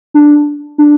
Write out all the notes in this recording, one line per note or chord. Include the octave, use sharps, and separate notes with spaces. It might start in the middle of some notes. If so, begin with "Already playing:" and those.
D4
D4